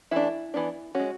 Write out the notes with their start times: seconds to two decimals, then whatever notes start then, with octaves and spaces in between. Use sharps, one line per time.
0.11 E3 A3 D4 E4
0.54 E3 B3 D4
0.95 G#3 C#4 F#4